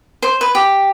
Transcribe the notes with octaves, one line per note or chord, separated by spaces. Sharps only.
C5
B4
G4